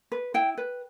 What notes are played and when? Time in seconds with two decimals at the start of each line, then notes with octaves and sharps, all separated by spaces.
0.12 B4
0.34 E4 G5
0.58 B4